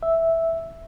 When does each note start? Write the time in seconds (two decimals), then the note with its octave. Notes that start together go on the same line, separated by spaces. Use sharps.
0.03 E5